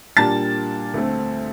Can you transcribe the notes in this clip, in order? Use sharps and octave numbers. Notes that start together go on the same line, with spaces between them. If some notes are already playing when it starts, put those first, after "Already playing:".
A#2 G3 A#3 D4 A5 A6
D2 D3 A3 C4